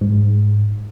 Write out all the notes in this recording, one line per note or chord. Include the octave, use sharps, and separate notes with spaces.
G#2